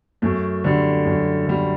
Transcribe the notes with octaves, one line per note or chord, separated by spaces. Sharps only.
F#2 A3
D3 G3
F#2
D3 G3